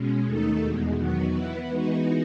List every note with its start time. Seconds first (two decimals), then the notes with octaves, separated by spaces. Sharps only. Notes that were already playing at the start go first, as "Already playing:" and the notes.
Already playing: B2 G#3 C#4
0.25 D#2 D#3 A3 D#4 A4
0.61 E2 B2 G#3
0.97 E2 D#3 F#3 B3 F#4
1.32 E3 B3 E4 B4
1.68 E3 G#3 B3 D#4 F#4